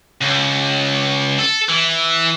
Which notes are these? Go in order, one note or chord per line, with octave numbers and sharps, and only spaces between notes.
C#2
A4
E3